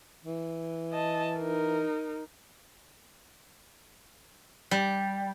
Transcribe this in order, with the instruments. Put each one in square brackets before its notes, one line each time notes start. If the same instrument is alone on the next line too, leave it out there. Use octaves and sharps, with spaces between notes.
[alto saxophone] E3
[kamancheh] D#5 A5
D#4 A#4
[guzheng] G3